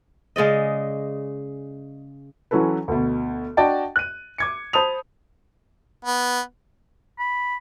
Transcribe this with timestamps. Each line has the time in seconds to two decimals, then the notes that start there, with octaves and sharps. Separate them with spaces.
0.36 C#3 G#3 D5 D#5
2.51 E3 F#3 C#4 E4 A4 B4
2.88 D2 B2
3.57 D4 F#4 D5 D#5 G5 A5
3.96 F#6 D#7
4.38 D6 G#6 C#7
4.73 C5 A5 B5 D#6 F7
6.05 B3
7.19 B5